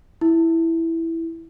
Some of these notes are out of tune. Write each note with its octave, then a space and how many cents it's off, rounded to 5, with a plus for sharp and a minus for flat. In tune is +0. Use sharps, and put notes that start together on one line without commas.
E4 +0